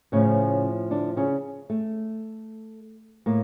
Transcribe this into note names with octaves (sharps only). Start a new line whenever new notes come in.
A2 C#3 F3 C#4
D3 D4
C#3 C#4
A3
A2 A#3